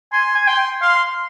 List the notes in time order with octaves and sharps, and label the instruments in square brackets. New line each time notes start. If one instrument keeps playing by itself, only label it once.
[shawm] G#5 [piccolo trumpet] C6
[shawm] G#5
[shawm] G5 [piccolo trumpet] C6
[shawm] F5 [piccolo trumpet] C6